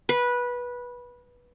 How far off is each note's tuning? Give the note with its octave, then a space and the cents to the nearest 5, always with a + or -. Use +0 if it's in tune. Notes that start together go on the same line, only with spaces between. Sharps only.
B4 -15